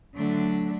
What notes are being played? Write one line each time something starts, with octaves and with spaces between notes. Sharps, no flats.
D3 F#3 A3 D4